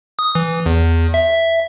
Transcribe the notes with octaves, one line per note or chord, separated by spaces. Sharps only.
D#6
E3
E2
E5